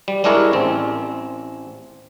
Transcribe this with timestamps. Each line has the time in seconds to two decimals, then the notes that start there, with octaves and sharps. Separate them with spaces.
0.08 G3
0.24 G3 G#3 D4 E4 A#4 C#5
0.53 A1 C4